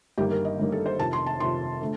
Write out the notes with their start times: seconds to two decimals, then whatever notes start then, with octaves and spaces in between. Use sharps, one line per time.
0.18 G1 G2 D#3 G3 A#3 G4
0.31 A#4
0.45 D#5
0.58 G1 G2 D#3 G3 A#3
0.72 A4
0.86 C5
0.99 F2 C3 D#3 A5
1.13 C6
1.26 A5
1.40 F2 C3 D#3 C6
1.81 D3 A3